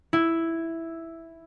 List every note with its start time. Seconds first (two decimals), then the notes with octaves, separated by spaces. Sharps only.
0.13 E4